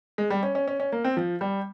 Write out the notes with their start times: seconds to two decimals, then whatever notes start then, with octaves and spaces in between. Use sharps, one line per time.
0.18 G#3
0.30 G3
0.43 C#4
0.55 C#4
0.68 C#4
0.80 C#4
0.92 A#3
1.04 C4
1.17 F3
1.41 G3